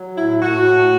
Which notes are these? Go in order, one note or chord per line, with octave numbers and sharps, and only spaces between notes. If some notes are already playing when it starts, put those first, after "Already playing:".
Already playing: F#3
A2 E4
A2 F#4
A2